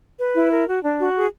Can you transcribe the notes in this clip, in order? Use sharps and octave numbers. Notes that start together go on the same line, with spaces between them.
B4
E4
A#4
F#4
D4
F#4
G#4